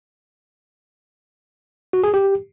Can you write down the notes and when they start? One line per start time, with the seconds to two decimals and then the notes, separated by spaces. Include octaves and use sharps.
1.93 F#4
2.04 G#4
2.14 G4